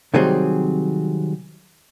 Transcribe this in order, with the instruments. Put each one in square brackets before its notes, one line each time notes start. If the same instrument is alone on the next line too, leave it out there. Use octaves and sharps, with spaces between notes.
[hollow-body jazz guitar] C3 D#3 F#3 G3 C4 G#4